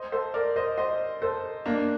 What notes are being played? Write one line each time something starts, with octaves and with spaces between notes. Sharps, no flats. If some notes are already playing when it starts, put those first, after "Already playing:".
Already playing: C5 D#5
A4 C5
A#4 D5
C5 D#5
C5 D#5
A4 C5
A#3 D4